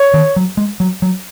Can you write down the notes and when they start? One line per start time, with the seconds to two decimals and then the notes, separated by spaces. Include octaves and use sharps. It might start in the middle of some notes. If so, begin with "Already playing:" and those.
Already playing: C#5
0.14 D#3
0.36 F#3
0.57 G#3
0.80 F#3
1.02 F#3